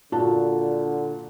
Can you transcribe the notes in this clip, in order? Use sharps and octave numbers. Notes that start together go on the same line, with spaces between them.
A#2 D3 F#4 A5